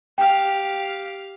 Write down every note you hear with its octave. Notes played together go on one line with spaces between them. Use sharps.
G4 F5 G5